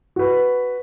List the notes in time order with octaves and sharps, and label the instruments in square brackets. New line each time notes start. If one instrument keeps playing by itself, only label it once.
[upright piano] F#4 B4